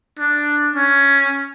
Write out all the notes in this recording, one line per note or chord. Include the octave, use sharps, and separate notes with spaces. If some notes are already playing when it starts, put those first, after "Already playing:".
D4
C#4